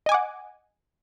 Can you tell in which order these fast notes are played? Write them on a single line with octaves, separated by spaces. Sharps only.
D#5 G#5 D6 F#5